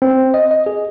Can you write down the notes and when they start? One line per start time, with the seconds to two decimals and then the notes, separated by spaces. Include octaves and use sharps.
0.02 C4
0.34 D#5
0.51 D#5
0.66 G#4